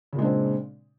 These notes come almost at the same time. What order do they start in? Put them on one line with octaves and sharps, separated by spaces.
C#3 A#2 G#3 D4 C4